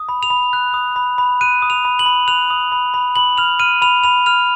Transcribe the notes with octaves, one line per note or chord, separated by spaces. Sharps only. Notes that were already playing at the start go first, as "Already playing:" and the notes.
Already playing: D#6
B5
F7
B5
F#6
D#6
B5
B5
F#6 D#7
D#6
F7
B5
F#7
B5
F#6 F7
D#6
B5
B5
B5 F#7
F6 F7
F6 D#7
B5 F7
B5 F7
F6 F7